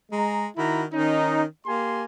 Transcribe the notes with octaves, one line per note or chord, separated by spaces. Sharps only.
G#3 A#5
D#3 E4 F#4 A#5 B5
D#3 C#4 D#4
A#3 G4 G#5 C6